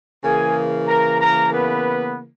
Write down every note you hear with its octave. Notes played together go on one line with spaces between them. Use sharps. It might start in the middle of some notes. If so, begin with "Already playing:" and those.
C#3 E3 A#3 G#4 G#5
A#4 A#5
A#4 A#5
B3 B4